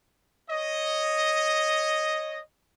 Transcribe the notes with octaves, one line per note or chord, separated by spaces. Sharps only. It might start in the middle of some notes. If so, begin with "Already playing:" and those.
C#5 D#5